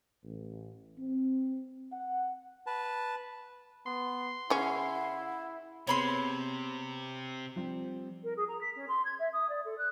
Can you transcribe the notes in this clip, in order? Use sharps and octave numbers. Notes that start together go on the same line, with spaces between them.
A1
C4
F#5
B4 A5
B3 C6
C#3 C#4 E4 F#5
C3 B3 C4 G#4 C#5 B5 C6
F3 G3 C4
A#4
G#4
A#5
B6
C#4
C6
G#6
E5
D#6
D5
A4
F#6